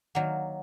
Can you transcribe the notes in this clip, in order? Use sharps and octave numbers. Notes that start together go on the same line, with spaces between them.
D#3 F#3 A#3 F#5